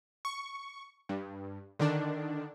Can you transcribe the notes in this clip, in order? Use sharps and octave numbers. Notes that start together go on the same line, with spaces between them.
C#6
G2
D3 D#3 D4